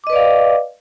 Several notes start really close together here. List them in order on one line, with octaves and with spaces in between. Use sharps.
D6 D#5 B4 D5 F5